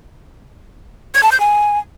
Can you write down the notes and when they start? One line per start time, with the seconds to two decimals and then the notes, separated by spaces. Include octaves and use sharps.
1.15 G#6
1.23 A5
1.32 G6
1.40 G#5